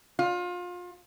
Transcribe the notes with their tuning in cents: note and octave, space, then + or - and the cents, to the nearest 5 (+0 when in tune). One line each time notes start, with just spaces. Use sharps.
F4 +30